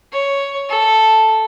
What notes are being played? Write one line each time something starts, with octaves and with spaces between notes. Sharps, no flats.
C#5
A4